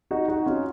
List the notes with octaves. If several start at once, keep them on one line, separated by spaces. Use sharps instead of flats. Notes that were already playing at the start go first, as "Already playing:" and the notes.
D#4 F#4
D#4 F#4
C#4 F4